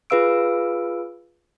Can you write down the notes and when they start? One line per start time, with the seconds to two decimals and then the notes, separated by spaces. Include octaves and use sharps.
0.10 F4 G#4 B4 F5 E6 D7